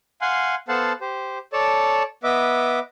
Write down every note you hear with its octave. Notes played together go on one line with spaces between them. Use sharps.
F5 F#5 G#5 C6
B3 A4 C5 F5 F#5 A5
G4 C5
A4 C#5 D5 A5
B3 B4 D#5 E5 D6